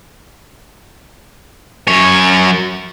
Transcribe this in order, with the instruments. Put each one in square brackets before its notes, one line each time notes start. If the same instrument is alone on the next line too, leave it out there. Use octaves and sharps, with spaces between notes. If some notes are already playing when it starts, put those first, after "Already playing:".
[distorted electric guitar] F#2 C#5